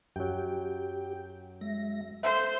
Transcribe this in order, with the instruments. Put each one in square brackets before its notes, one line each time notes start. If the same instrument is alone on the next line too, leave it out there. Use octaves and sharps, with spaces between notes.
[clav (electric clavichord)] F#2 F#3 [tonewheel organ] G4 [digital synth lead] G5
[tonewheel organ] G#3 E5 [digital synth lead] A#6
[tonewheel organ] A4 [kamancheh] C5 [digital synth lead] E5